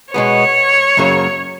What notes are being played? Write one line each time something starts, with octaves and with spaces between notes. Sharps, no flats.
B2 G#3 B3 C#5
F#2 C#3 F#3 A#3